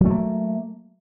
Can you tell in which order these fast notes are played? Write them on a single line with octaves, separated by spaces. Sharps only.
F#3 A3 A#3